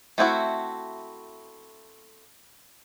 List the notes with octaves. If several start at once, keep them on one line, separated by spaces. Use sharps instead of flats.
A3 C4 E4 F#4